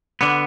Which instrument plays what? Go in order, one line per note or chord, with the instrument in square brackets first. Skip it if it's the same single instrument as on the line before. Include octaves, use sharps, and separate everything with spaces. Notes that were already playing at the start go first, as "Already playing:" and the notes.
[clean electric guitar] D3 B3